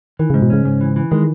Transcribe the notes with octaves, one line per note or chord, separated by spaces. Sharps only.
D#3 E3
G#2 C#3
B2
C#3 C#4
G#2
E3
E3
D#3 G#3